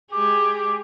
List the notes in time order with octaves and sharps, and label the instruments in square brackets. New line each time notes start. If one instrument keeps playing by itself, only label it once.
[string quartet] G#3 G4 G#4 [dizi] D6